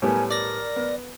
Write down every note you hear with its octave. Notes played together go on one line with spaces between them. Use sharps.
A2 G3 B3 A#4 C#5 G#5
A#4 D5 A#6
B3